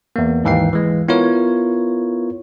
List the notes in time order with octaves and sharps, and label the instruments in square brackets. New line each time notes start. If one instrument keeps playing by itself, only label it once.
[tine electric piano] E2 A#3
D#2 G#2 E3 F5 G5 C7
E3 G#3
B3 E4 F4 A#4 C#5